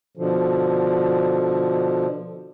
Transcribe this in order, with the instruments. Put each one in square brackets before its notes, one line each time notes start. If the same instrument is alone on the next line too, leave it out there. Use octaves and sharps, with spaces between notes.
[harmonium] B2 D3 F3